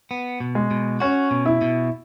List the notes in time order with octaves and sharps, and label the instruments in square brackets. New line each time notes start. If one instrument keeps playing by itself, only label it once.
[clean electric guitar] B3
B2
[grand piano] G#3
[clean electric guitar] B2
[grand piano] C#4 [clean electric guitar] F#4
[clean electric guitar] B2
[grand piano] E4
[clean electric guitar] B2